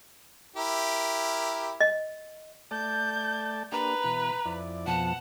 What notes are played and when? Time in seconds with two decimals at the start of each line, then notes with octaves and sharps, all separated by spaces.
0.56 E4 G4 A#4
1.81 D#5
2.71 A3 D5 A5 G6
3.72 A#3 D4 G4 B4 A#5
4.04 B2 E3
4.45 F2 E4 D5
4.87 F2 B2 F3 F#5 A5